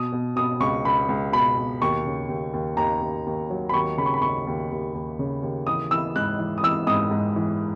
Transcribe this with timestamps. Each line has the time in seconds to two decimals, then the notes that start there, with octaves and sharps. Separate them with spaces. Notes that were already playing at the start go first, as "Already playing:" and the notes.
Already playing: B2 D#6
0.12 B2
0.36 B2 D#6
0.60 C#2 C#6
0.85 C#2 B5
1.09 C#2
1.32 B2 B5
1.58 B2
1.82 D#2 C#6
2.06 C#3
2.29 D#2
2.53 D#2
2.77 D#2 A#5
3.01 D#2
3.26 D#2
3.50 F#3
3.69 B5
3.74 D#2 C#6
3.97 C#3 B5
4.06 C#6
4.14 B5
4.22 D#2 C#6
4.47 D#2
4.71 D#2
4.94 D#2
5.19 C#3
5.43 D#2
5.67 E3 D#6
5.91 E3 E6
6.16 G#2 F#6
6.39 E3
6.58 D#6
6.63 E3 E6
6.87 G#2 D#6
7.11 G#2
7.36 E3